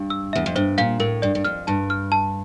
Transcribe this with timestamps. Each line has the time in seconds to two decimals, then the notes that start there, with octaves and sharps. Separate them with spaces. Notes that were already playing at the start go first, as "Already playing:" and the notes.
Already playing: G2
0.10 E6
0.33 E2 E5
0.46 F2
0.56 G2 C5
0.78 A#2 F5
1.00 A2 A#4
1.22 G2 D5
1.35 G2
1.45 F2 F6
1.67 G2 A5
1.90 F6
2.12 A5